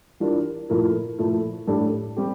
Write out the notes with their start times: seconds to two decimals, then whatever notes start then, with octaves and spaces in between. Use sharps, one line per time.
0.20 E3 G3 D4 F4 A#4
0.69 A#2 F3 A3 E4 A#4
1.19 A#2 F3 A3 E4
1.67 A2 G3 D4 A4
2.16 G3 C4 G4